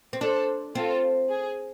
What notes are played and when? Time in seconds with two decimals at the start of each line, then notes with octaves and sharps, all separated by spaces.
0.13 C4
0.21 D4 A4 C5
0.75 C4 F4 A4
1.29 G#4